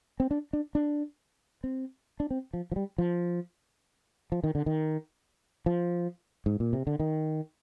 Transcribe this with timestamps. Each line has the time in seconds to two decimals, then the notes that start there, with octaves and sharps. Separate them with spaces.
0.20 C4
0.31 D4
0.53 D4
0.75 D4
1.64 C4
2.20 D4
2.31 C4
2.53 F3
2.72 F3
2.76 G3
2.98 F3
4.32 F3
4.44 D#3
4.55 D3
4.66 D#3
5.66 F3
6.46 G#2
6.60 A#2
6.73 C3
6.87 D3
7.00 D#3